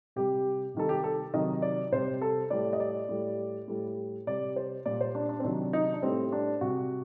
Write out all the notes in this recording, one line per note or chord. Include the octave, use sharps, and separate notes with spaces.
C3 G3 G4
C3 D#3 G3 A4
G4
A4
C3 D#3 F#3 D#5
D5
C3 G3 C5
A4
A2 G3 D5
D#5
D5
A2 G3
A2 G3
C3 G3 D5
C5
A#2 G3 D5
C5
D4
D4
C4
C3 D#3 F#3 D4
D#4
D4
A2 G3 C4
D4
C3 G3 F#4